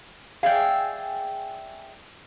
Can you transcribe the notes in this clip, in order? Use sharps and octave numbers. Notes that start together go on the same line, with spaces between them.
G#4 D5 E5 F5 G5